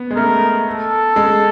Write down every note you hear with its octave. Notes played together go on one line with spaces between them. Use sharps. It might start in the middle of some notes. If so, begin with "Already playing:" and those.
Already playing: B3
G#3
A3 A#4
A4
G#3